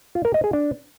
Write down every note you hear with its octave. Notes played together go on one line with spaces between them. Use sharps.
F4
A#4
D#5
G#4
D4